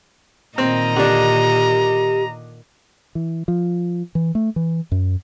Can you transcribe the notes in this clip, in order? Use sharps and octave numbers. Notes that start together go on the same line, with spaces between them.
A#2 D#3 C4 D#5 A#5
D3 D4 G4
E3
F3
E3
A3
E3
F#2